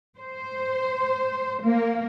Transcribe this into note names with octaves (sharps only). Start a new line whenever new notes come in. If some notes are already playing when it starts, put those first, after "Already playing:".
C5
A#3